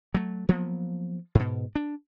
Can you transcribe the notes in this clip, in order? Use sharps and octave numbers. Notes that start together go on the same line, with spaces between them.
F#3 A3
F3 F#3 A#3 B3
G#2 B2
D4